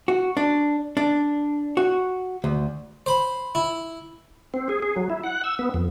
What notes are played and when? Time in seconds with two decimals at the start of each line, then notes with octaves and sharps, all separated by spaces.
0.08 F#4
0.37 D4
0.97 D4
1.77 F#4
2.44 D2
3.06 C5 B5
3.55 E4
4.54 C4
4.69 G#4
4.82 G#4
4.96 F#3
5.10 E4
5.24 F#5
5.44 E6
5.59 B3
5.74 F2